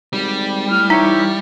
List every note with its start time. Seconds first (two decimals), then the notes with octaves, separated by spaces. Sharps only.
0.13 G#1 G3
0.70 A2 F6
0.90 E3 D#4 G4 C#5 E5